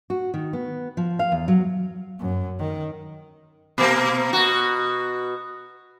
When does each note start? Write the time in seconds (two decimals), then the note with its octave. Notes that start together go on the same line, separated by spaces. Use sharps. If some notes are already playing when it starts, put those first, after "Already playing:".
0.10 F#4
0.34 D#3
0.53 B3
0.97 F3
1.19 F5
1.32 E2
1.48 F#3
2.20 F#2
2.59 D#3
3.78 B2 A#3
4.33 B2 F#4